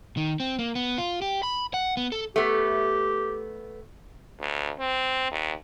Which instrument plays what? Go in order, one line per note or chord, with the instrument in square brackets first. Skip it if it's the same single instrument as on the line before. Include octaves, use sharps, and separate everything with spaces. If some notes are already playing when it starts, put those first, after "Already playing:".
[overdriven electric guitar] D#3
C4
A#3
B3
F4
G4
B5
F#5
B3
A4
[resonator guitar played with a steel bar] A3 B3 [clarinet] G4
[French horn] D2
C4
D#2